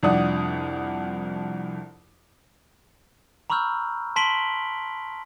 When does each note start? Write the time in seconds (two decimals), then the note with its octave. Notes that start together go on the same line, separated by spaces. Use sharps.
0.03 C2 F2 D4 D5 F#5 D#6
3.50 A#5 B5 C#6 E6 F6 G6
4.16 A5 C6 B6 D7 F#7 G7